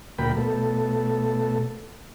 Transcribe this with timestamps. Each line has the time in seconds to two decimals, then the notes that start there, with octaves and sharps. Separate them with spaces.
0.18 D2 A#2 F#3 A#4 G5 B5
0.37 B2 A3 A4